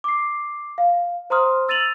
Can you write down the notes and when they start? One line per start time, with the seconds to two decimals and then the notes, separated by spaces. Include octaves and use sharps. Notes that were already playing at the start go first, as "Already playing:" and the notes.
0.04 D6 C7
0.78 F5
1.30 C5 A#5 C6 D#6 F6
1.68 E6 A6 D#7 F7 F#7